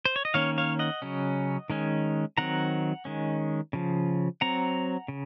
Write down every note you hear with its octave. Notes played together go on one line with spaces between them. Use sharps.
C5
C#5
D#5
D#3 A#3 C#4 C#5 F5
C#5 F5
D#5 F#5
C#3 F#3 C#4
D#3 G#3 C#4
D#3 F#3 C4 F#5 A#5
D#3 G#3 C#4
C#3 F3
F#3 C4 F#5 A#5
C#3